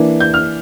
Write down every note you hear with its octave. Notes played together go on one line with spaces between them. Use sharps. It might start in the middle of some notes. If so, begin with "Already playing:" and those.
Already playing: E3 A#3 D4
G6
F6